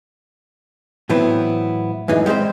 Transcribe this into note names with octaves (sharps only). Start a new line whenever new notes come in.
A2 E3 F#3 B3 C4 E4
F#2 A2 E3 G#3 D#4
G3 G#3 A#3 C4 C5